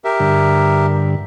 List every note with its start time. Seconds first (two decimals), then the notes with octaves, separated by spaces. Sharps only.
0.04 G4 A#4 E5
0.20 G2 D3